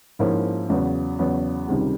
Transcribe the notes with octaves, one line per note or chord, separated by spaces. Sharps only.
G#2 F3 A#3 C#4 E4
E2 C#3 F#3 B3
E2 C#3 F#3 B3
C#2 C3 D#3 G3